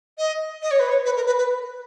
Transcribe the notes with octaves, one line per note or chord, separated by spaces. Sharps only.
D#5
D#5
C#5
B4
C#5
B4
A#4
B4
B4